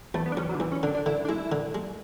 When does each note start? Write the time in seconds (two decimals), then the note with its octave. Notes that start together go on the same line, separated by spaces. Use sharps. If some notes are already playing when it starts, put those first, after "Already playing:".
0.14 E2 A3
0.26 B3
0.32 D4
0.37 E2 C#4
0.49 F#3
0.55 D3
0.60 E2 E3
0.72 C#4
0.83 D3 D4
0.95 D4
1.06 D3 E4
1.25 D4
1.29 G#3 E4
1.52 D3
1.75 G#3